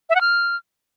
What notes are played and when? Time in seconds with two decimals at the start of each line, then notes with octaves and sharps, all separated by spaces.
0.10 E5
0.15 F#5
0.21 F6